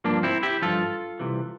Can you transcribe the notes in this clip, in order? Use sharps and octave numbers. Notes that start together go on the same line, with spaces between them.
G2 F3 A#3 D4
C4 E4
E4 G4
G2 F3 F4 A4
C2 C3 E3